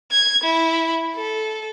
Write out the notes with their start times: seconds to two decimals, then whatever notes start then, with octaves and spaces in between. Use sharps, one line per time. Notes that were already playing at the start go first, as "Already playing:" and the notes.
0.11 G#6
0.43 E4
1.15 A4